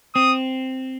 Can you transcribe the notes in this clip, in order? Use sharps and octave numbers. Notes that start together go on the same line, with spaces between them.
C4 D#6